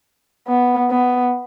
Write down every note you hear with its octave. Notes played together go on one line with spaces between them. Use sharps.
B3
B3